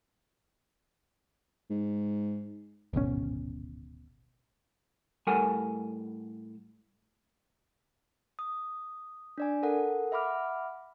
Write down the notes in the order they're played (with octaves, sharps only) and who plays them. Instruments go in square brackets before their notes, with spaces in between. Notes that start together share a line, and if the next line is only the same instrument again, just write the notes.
[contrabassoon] G#2
[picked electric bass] D1 G#1 B2 C#4
[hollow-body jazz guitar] A2 G3 A4 A#4 F#5 G#5
[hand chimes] D#6
D4 D5 G#5
A4 A#4 F#5
E5 F#5 B5 D6 F6